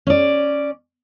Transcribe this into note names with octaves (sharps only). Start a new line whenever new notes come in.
C#4 D5